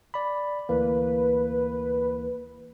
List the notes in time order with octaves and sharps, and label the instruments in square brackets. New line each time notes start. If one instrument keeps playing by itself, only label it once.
[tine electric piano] D5 B5
[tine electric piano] D2 E3 A#3 [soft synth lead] B4